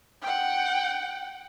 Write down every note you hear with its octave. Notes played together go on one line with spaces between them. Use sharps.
F#5 G5